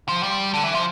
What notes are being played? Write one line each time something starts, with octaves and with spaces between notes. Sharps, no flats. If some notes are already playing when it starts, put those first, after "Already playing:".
F3
G3
D3
E3
F3